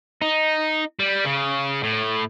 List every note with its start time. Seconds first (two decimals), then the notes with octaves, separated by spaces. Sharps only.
0.22 D#4
0.99 G3
1.25 C#3
1.83 A2